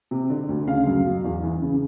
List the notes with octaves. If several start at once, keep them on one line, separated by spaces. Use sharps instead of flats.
C3
D3
D2
C#3 F5
F#2
B2
E2
E3
C#3